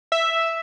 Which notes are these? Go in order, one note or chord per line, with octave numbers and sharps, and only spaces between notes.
E5